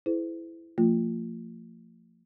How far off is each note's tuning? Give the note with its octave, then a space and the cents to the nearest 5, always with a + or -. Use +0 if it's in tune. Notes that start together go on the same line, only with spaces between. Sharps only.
E4 +5 G#4 +45 C5 -40
F3 +0 A#3 -45 F4 +0